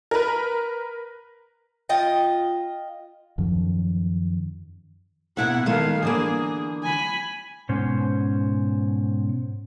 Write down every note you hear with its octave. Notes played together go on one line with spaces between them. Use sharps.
A#4 B4
F4 D#5 G5
F#2 D#3 F3
B2 A#3 E4 E5 F#5
D#3 G#3 A3 F5
D3 E3 A#3 G#4
G#5 B5
G#2 B2 C#4 C5